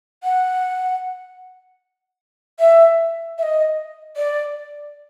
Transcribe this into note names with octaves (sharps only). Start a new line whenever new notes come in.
F#5
E5
E5
D#5
D5